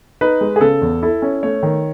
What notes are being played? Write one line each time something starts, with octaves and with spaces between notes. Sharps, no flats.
D#4 B4
G#3
G#4
C#3 A4
E2
E4 A4
C#4
A3 C#5
D#3